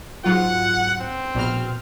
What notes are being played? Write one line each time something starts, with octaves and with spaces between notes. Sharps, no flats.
G#2 F#3 F4 F#5
C4
A#1 B2 F6